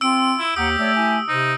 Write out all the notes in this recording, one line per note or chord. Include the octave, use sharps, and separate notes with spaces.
C4 F4 E6 D7
E4
D#2 G4 F#5 A#5 D#6
A3 C#5 D5 E6
E4 G#5
C3 D#4 C5